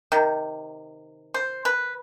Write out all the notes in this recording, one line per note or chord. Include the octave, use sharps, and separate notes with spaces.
C3 D#3
C5
B4